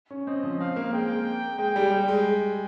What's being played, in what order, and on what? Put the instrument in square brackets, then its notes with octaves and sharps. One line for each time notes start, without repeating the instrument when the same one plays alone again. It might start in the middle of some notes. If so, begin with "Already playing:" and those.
[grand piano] C#4
[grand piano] C4 [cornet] D#5
[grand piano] F3
[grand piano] C4 [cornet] F5
[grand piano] A#3
[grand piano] G#3 [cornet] G5
[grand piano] G#3 [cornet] G5
[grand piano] G3
G3
G#3